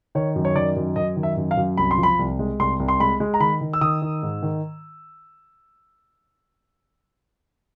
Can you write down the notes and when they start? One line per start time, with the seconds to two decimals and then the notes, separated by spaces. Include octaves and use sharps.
0.15 D#3 C#5
0.36 F#2
0.45 C#5
0.55 D#3 D5
0.76 F#2
0.96 F#2 D#5
1.16 D#3
1.23 E5
1.37 F#2
1.51 F5
1.57 F#2
1.77 C2 B5
1.91 C6
1.98 F3
2.03 B5
2.19 C2
2.39 G#3
2.59 C2 C6
2.80 C2
2.88 C6
3.00 G#3 B5
3.20 G#3
3.34 A#5
3.40 D#3 B5
3.61 D#3
3.73 E6
3.81 D#3 D#6
4.02 D#3
4.23 G#2
4.43 D#3